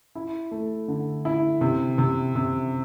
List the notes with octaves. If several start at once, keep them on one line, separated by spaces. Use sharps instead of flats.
E4
A3
D3
E4
C3
C3
C3